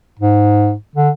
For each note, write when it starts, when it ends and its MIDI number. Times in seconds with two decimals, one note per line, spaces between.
0.19 0.74 44
0.96 1.10 50